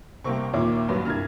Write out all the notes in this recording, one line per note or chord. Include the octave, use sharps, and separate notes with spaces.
C2 C3 A#3 C4 C#6
D#2 A#2 E4 C#5 D6
G2 F#3 B4
C2 G2 F6 G#6